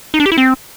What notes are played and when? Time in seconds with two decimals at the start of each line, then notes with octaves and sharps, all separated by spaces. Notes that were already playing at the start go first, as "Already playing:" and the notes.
0.14 D#4
0.20 D4
0.26 G4
0.32 E4
0.38 C4